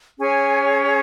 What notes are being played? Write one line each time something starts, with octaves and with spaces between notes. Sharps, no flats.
C#4 G#4 C#5 G#5